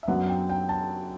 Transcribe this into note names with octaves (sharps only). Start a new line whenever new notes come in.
E5
F#2 F#3 B3 D4 F#5
G5
G5
A5